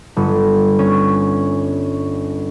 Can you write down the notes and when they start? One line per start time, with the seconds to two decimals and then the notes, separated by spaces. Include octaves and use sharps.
0.17 G1
0.79 C#4